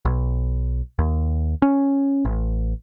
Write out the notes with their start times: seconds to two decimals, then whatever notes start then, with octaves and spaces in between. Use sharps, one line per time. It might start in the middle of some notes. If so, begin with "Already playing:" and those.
0.05 B1
0.99 D#2
1.62 C#4
2.25 A1